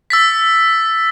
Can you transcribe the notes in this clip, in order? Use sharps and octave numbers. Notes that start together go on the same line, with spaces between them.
E6 A6 B6